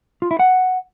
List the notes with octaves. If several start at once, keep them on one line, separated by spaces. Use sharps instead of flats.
F4
E4
F#5